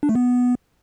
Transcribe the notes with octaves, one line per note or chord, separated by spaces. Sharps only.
D4
A3
B3